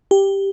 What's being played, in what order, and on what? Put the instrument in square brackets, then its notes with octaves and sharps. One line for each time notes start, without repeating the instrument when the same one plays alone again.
[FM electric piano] G4